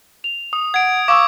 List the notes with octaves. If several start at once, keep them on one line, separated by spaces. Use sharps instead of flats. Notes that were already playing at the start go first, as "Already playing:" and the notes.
F7
D#6
F#5 G#6 D7
F5 C#6 D6 E6